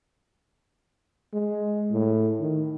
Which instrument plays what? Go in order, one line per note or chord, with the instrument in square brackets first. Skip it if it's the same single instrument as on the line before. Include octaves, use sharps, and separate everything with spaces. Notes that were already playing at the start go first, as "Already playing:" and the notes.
[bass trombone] G#3
A2
D#3